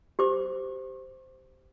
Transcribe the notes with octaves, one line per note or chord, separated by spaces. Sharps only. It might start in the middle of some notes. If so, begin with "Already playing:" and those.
G4 C5 D6